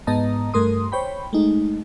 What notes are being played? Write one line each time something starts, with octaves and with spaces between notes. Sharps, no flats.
G#2 B3 D#5 A5 A#5 D#6
G2 A3 A#4 C6 D#6
C5 C#5 G5 B5
G#3 A3 D#4